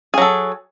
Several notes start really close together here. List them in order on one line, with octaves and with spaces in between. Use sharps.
G#4 F#3 A4